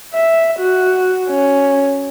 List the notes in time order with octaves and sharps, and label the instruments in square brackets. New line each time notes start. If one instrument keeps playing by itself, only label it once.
[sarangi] E5
F#4
C#4